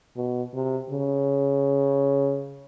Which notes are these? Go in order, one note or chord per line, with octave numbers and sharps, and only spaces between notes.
B2
C3
C#3